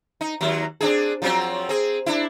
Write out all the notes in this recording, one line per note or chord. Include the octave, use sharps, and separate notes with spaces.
D#4
D#2 F#3
C4 D4 G#4
F3 F#3 C4
C4 G#4
D4 E4